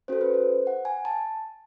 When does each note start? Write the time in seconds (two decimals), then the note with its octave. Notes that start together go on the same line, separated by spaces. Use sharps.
0.08 C#4 F#4 A4 C5
0.21 B4
0.34 C5
0.67 F#5
0.85 G#5
1.05 A5